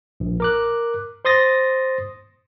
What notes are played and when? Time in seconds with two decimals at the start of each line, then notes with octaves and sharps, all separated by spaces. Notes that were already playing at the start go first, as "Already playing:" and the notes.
0.20 A#1
0.40 A#4 D6 F#6
1.25 C5 C6 D#6 A6 A#6